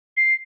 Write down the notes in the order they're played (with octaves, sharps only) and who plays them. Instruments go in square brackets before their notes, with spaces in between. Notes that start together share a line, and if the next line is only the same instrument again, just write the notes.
[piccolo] C7